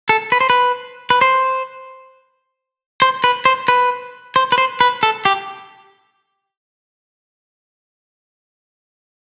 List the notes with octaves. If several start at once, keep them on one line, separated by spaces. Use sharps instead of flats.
A4
B4
C5
B4
B4
C5
C5
B4
C5
B4
C5
B4
C5
B4
A4
G4